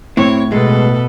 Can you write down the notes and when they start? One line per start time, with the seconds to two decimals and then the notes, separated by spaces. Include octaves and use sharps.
0.17 A2 C4 E4 C#5
0.52 B2 G#3 A4 B4